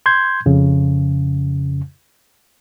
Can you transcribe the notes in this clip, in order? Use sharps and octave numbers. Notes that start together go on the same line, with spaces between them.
C6 G6 G#6
F2 C#3